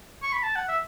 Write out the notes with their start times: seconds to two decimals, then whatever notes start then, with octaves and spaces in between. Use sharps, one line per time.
0.23 C#6
0.33 B5
0.43 A5
0.55 F#5
0.68 E5